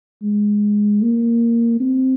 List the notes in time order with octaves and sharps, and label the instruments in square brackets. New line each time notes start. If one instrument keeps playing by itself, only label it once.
[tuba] G#3
A#3
C4